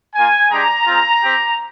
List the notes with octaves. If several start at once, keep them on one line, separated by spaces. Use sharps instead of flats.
A#3 F4 G#5
G#3 D4 G4 A#5
G#3 C4 F4
C4 G4